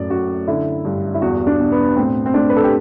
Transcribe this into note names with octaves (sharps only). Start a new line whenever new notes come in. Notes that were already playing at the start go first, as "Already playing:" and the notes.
Already playing: F#2 A2 D5
F#2 F#4
D3 E4
G2
E4
E2 F#4
D4
B2
B3
A2 C4
C4
A2 D4
B4
A4
G4